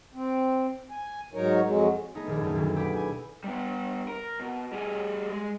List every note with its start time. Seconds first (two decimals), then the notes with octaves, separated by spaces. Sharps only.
0.14 C4
0.91 G#5
1.34 G#2 F#3 D#4 A#4 C#5
1.65 F2 F#3 G#3
2.15 G#3 A3 B3 D#4
2.27 D#1 A#1 D#2 G#4
2.41 F#2 G3 A3
2.55 D2 B2 D#3 F#3 A#3
2.76 E4 G4 G#4 B4 D6
2.96 G#5
3.44 G3 B3
4.08 A#4
4.39 B2
4.72 G3 G#4
5.31 G#3